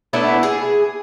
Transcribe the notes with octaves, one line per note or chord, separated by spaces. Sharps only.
A3 B3 D4 E4
G#4